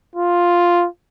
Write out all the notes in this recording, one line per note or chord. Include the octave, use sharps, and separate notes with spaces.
F4